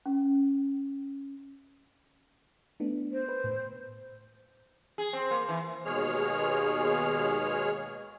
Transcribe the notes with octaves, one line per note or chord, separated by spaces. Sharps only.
C#4
A3 B3 D4
C5
B4
A2
G#4
C4
A#3
E3
D#2 B2 G#3 G#4 C#5 F6